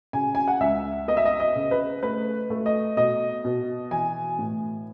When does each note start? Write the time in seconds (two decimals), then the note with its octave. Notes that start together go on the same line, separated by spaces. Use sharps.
0.13 C#3 G#5
0.35 G#5
0.48 F#5
0.60 C#2 E5
1.08 B3 D#5
1.17 E5
1.25 D#5
1.40 D#5
1.55 C#3
1.71 B4
2.03 A3 B4
2.50 A3
2.66 D#5
2.97 B2 D#5
3.45 B2
3.91 E3 G#5
4.39 A2